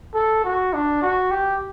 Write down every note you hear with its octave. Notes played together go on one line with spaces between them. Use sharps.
A4
F#4
D4
F#4
G4